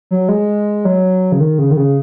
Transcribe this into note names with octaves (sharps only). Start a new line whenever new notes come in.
F#3
G#3
F#3
C#3
D#3
C#3
D#3
C#3